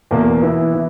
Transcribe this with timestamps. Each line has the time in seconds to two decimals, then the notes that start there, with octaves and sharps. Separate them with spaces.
0.11 E2 B2 A#3
0.42 E3 B3 E4
0.74 E3